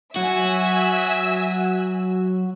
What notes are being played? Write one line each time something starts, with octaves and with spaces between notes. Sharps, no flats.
F#3 F#4 E5 G#5 E6